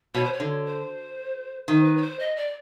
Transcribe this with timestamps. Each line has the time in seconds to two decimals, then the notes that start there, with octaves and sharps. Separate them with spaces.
0.14 B2 C#5
0.24 C5
0.33 C#5
0.40 D3
0.66 C5
1.68 D#3 C5
1.85 B4
1.97 C#5
2.02 C5
2.19 D#5
2.36 D5